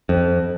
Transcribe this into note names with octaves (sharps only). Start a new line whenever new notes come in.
F2